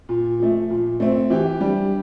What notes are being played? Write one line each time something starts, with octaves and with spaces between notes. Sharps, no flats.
A#2
F3 A3
A#2
A3 C4
E3 G4
G3 D4